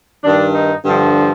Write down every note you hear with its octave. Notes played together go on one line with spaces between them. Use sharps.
G2 D#3 D4
D#4
G2 D3 F3